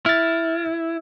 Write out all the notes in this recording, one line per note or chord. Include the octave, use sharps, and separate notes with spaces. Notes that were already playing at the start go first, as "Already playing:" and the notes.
E4 F6 A6